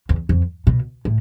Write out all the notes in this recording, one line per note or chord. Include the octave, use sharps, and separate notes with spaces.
E2
F2
B2
A2